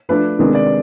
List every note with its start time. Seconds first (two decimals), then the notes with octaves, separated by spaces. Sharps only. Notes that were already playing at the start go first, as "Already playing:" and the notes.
0.09 F3 A3 D4 B4
0.39 C3 D#3 G#3 B3 D4
0.55 D5